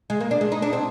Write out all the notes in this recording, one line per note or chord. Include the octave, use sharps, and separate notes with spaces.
G#3
A#3
D4
G#3
D#4
D4
C4